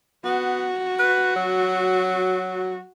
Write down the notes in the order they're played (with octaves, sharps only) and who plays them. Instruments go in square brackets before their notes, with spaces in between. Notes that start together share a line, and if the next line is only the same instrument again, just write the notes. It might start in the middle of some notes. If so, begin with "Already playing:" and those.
[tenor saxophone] B3 [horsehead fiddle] F#4
[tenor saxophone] B4
F#3